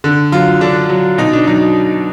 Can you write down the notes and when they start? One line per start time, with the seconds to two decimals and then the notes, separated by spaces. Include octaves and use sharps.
0.04 D3
0.32 F#3 F4
0.61 D3 D4
0.89 F#3
1.18 B2 D#4
1.33 D4
1.47 F#3 D#4